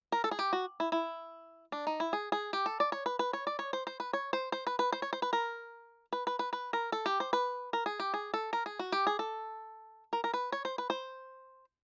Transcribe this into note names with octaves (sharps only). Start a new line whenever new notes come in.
A#4
A4
G#4
G4
F#4
E4
E4
D4
D#4
E4
G#4
G#4
G4
A4
D5
C#5
B4
B4
C#5
D5
C#5
C5
C5
B4
C#5
C5
C5
B4
B4
C5
C#5
C5
B4
A#4
B4
B4
B4
B4
A#4
A4
G4
C5
B4
A#4
G#4
G4
G#4
A4
A#4
G#4
F#4
G4
G#4
A4
A#4
A#4
B4
C#5
C5
B4
C5